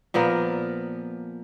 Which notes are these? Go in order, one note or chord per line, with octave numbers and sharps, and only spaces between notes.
A#2 F3 B3 A#4